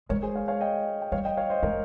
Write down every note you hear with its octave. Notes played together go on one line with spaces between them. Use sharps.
G#3 A#4 C#5
G#4 C5
C#5 F5
C#5 F5
D#5 G5
G5
G3 C#5 F5
D#5 G5
C#5 F5
C5 D#5
G#3 A#4 C#5